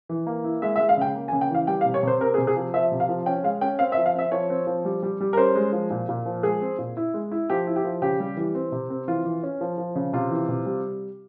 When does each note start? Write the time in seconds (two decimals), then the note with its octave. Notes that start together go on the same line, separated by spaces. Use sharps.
0.09 E3
0.27 A#3
0.44 E4
0.62 G#3 E5
0.76 E5
0.80 G#3
0.89 F5
0.97 C#3 G5
1.15 A#3
1.28 G#5
1.33 C#3
1.41 G5
1.50 E3 F5
1.67 G3 G5
1.81 F5
1.86 C3
1.94 C#5
2.03 C3 C5
2.21 C4 A#4
2.34 G#4
2.38 C3
2.47 G#4
2.56 F3
2.74 F3 E5
2.91 C3
3.00 F5
3.09 F3
3.26 C#4 G5
3.44 G#3 F5
3.61 C#4 G5
3.79 C4 F5
3.92 E5
3.97 F3
4.06 F5
4.15 C4 E5
4.32 F3 C#5
4.50 C4
4.67 F3
4.85 G3
5.03 G3
5.20 G3
5.33 A#4
5.37 C#4 C5
5.55 G#3
5.72 F3
5.90 A#2
6.09 A#2
6.26 F3
6.43 G#3 G#4
6.61 C4
6.78 A#2
6.97 E4
7.14 G#3
7.31 E4
7.50 F3 G4
7.67 E4
7.76 G4
7.85 F3
8.02 C#3 G4
8.20 G3
8.37 E3
8.55 C4
8.72 C3
8.90 C4
9.08 E3 F4
9.25 E3
9.43 C#4
9.61 F3
9.78 F3
9.95 C#3
10.13 C3 F4
10.31 E3
10.49 C3
10.66 G3